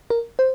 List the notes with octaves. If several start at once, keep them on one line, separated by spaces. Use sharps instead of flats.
A#4
C5